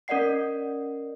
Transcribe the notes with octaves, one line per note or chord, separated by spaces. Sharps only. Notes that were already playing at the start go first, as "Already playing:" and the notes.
C#4 A#4 D5 D#5 F#5 C7